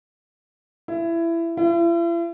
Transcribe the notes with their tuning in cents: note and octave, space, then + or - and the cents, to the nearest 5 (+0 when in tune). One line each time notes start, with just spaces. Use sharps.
E4 +20
E4 +45